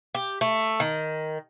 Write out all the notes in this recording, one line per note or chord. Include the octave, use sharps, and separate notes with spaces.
G4
A3
D#3